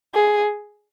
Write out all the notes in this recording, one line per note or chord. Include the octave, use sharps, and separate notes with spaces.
G#4